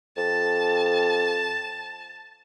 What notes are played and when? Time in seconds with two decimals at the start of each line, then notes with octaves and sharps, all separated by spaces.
0.17 F2 A5